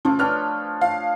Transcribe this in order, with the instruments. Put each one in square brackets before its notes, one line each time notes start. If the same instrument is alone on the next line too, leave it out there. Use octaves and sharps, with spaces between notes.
[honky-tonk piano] C#3 [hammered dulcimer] F3 A3
[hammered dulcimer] D4 C#5 G5 [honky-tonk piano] B4 F6
[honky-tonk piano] F5